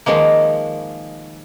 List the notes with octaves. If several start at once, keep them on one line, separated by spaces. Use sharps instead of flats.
D#3 F3 G#3 A#3